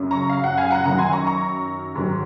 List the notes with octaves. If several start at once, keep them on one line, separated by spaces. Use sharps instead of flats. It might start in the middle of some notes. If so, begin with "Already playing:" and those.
Already playing: F#2 C#3 F#3
A#5 C#6
F5
F#5
F5 G#5
F#5 A#5
F#2 D#3 F#3 F#5 A#5
G#5 C6
A#5 C#6
A#5 C#6
G#2 D#3 F#3